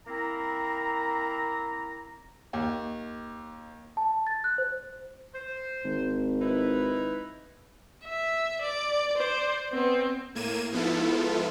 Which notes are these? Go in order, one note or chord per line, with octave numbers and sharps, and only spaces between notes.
A#3 C4 E4 A#5
D#2
A5
A6
F#6
C5
C5
G#1
D#4 E4 B4
E5
D5
C5 D5
B3 C4
A2 A#3 G#6 D#7 E7
G#2 F3 B3 E4 F4 A4